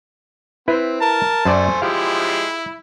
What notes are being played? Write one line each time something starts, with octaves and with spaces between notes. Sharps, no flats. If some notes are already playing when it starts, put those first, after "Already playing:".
C4 E4 B4
A#4 A5
F#2 A3 C5 D5 G#5
F3 G#3 E4 G4 F5